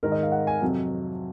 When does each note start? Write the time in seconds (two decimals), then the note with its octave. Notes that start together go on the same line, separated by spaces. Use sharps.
0.03 G#2 D#3 G#3 A#4
0.12 D#5
0.23 F5
0.32 F#5
0.47 G#5
0.61 F2 C3 F#3